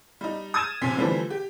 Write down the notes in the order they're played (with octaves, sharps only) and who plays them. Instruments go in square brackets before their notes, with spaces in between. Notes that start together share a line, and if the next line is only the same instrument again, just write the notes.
[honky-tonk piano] G3 D#4
D#6 F6 G#6 A6 D#7 E7
A#1 C3 G#5 C6 B6
D3 E3 F3 G3 A3 C4
G4